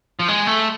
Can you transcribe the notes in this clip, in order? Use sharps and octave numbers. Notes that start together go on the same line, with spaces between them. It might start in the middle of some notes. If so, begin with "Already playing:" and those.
F3
G#3
A3